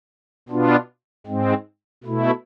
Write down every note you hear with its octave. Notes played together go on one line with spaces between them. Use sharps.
B2 B3 D4 F4
G#2 G#3 C4
B2 A3 E4